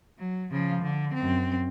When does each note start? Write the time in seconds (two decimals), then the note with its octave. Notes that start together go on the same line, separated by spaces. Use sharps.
0.19 F#3
0.51 C#3 F3
0.83 D3
1.14 F#2 C4